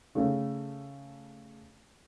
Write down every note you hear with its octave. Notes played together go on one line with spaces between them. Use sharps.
C#3 A3